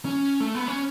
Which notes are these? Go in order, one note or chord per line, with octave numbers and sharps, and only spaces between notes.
C#4
A3
B3
C#4